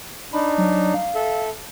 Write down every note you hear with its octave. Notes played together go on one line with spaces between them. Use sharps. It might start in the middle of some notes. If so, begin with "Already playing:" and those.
D4 D#4 B5
F#3
F5
A4 E5